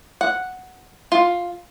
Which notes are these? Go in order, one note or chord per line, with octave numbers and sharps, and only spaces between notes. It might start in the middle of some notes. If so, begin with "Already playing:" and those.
F#5
F4